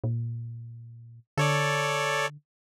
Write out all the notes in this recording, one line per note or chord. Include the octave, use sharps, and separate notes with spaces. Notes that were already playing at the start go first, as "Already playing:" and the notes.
A#2
D3 A4 C#5 D5